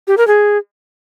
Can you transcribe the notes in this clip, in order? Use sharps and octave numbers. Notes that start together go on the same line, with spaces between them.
G4
A#4
G#4